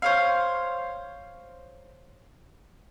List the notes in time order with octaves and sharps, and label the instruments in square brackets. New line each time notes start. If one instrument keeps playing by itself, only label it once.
[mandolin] C5 C#5 F5